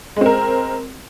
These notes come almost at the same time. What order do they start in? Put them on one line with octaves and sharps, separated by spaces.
G#3 C4 A#4